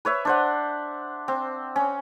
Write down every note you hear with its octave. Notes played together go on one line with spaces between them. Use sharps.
B4 C#5 E5
D4 C5 F#5
C4
C#4